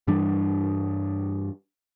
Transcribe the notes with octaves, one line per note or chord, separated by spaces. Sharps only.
G2 E3 G3 D4